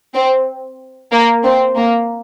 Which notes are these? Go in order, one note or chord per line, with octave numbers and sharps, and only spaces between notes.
C4
A#3
C4
A#3